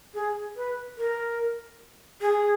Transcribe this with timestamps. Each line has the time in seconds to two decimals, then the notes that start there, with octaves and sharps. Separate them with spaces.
0.14 G#4
0.56 B4
0.98 A#4
2.21 G#4